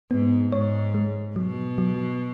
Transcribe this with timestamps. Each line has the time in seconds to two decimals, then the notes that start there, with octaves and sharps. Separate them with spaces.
0.11 G#2 B3
0.52 G#2 C#5
0.94 G#3
1.36 B2 F#3
1.78 F#3